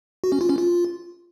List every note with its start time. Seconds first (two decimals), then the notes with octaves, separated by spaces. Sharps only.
0.24 F#4
0.32 C#4
0.41 F4
0.49 C#4
0.58 F4